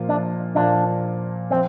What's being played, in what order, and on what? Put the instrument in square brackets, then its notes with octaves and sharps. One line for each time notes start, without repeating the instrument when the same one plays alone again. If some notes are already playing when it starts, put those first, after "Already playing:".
Already playing: [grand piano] A#2 F3 A#3 F4 A#4
[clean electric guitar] D4
[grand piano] A#2 F3 A#3 F4 A#4 [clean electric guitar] D4
[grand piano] F3 [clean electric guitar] C4